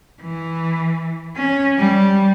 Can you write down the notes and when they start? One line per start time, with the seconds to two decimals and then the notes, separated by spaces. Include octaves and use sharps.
0.22 E3
1.36 C#4
1.78 G3